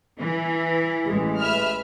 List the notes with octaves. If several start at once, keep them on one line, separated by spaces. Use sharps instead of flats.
E3
A1 G#3
B4 E5 F6